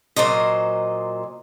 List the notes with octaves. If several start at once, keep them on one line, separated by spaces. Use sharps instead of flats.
A#2 F#3 C5 D#5